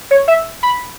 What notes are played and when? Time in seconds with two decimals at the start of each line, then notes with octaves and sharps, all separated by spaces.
0.11 C#5
0.28 E5
0.63 B5